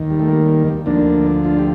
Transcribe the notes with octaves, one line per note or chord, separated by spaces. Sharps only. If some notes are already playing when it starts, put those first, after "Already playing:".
Already playing: D#2 D#3
G3
A3
G3 A#3
D2 D3 F3 A#3 D4
D4 F4
G4